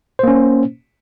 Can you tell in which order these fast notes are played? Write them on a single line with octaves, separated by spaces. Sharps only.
C5 A#3 C#4